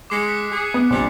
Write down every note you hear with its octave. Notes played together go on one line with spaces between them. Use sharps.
G#3 D6 C7 C#7
F#6 B6 C#7
G#4
B3
A#1 C3 G3